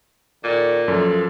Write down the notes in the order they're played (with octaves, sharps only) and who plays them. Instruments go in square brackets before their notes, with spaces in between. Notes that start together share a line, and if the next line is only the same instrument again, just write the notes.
[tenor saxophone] A#2 [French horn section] D#3 A4 D5
[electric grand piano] F#2 F3 [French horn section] A4